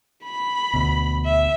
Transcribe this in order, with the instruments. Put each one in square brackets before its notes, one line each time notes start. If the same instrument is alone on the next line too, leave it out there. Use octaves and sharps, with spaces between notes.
[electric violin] B5
[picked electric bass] D2 B2
[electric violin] E5